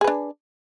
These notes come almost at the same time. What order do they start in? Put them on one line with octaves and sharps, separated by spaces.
G#4 B4 D4